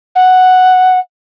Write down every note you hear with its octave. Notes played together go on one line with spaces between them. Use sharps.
F#5